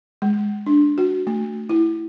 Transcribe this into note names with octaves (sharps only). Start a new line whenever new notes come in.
G#3
D4
F#4
A3
E4